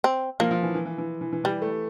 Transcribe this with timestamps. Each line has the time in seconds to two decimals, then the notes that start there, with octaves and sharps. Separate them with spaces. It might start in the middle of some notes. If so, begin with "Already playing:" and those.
0.04 C4
0.40 F3 A#3
0.51 F3
0.63 E3
0.74 E3
0.85 E3
0.98 E3
1.21 E3
1.33 E3
1.44 E3 G3
1.62 A3